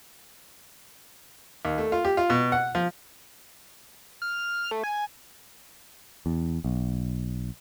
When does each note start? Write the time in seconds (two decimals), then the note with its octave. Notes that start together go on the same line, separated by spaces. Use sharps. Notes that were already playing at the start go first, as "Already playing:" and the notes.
1.65 D#2
1.78 A3
1.92 F4
2.05 G4
2.17 F4
2.30 B2
2.52 F#5
2.75 F3
4.22 F6
4.71 A3
4.84 G#5
6.26 E2
6.64 B1